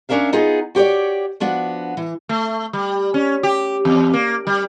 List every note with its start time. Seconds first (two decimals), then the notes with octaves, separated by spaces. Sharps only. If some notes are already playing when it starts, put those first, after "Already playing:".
0.09 C#4 D4 A#4 E5 F5
0.32 B3 D#4 F4 G#4
0.75 F#4 G4 B4 C#5 D5
1.40 F3 B3 D4 F#4
1.97 E3
2.29 A3
2.73 G3
3.14 C#4
3.43 G4
3.85 E2
4.14 A#3
4.47 G3